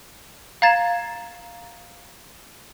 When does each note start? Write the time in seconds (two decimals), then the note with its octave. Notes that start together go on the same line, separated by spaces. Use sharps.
0.62 F5 A#5 G#6 A6 C7 E7